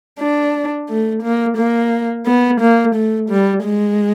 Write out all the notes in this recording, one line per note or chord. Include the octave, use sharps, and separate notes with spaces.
D4
A3
A#3
A#3
B3
A#3
A3
G3
G#3